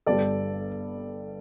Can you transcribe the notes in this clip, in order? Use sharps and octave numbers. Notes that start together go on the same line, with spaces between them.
G1 G2 G3 A4 D5